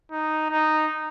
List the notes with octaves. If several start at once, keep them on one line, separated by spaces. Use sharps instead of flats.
D#4
D#4